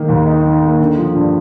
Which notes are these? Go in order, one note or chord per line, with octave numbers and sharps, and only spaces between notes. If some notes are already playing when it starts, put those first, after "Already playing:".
Already playing: D#3 A#3 D#4
D#2
D#4
D#3
A#3
D3
F3
G2